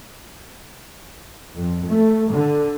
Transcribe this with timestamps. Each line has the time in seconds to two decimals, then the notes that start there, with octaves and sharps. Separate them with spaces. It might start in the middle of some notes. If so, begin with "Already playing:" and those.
1.54 F2
1.86 A3
2.31 D3